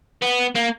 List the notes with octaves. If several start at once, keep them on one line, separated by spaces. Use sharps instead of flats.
B3
A#3